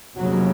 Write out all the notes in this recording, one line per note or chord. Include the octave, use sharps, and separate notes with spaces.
F1 D#2 C#3 F#3